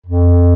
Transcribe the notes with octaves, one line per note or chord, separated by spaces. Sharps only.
F2